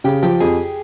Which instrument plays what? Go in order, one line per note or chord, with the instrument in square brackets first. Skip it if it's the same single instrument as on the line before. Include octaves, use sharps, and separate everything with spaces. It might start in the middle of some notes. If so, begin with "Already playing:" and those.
[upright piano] C#3 [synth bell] G4 G5
[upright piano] F3 [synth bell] G4 G5
[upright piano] F2 [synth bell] G#4 G#5